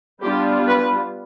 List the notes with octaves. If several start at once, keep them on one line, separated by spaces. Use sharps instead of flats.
G3 B3 D4 F4 G4
B4